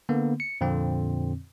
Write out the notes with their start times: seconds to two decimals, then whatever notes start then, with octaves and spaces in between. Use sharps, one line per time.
0.09 D3 A#3 B3
0.40 C#7
0.61 F2 A#2 D3 C4